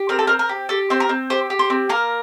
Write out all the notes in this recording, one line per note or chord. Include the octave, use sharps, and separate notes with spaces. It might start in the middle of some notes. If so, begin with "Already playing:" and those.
Already playing: G4
C4 A#4
A4
C4 A#4
A#4
G4
G4 A4
C4 C5
A#4
C4
G4 C5
G4
C5
C4
A#3 A#4